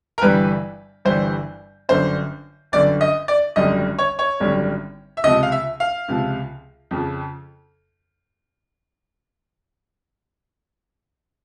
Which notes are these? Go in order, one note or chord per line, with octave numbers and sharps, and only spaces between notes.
A#4
G1 G2 E3 G3 B4
G1 G2 E3 G3 C5
G1 F#2 D3 C5
G1 F#2 D3 D5
D#5
D5
G#1 F#2 D3 G3 D#5
C#5
C#5
G#1 F#2 D3 G3
E5
C#2 C3 F3 D#5
F5
E5
F5
C#2 C3 F3
F2 C#3 F3